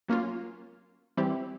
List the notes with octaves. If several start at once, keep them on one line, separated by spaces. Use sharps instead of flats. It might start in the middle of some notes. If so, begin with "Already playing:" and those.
F#3 A#3 C#4 F4
E3 G3 C4 E4 G4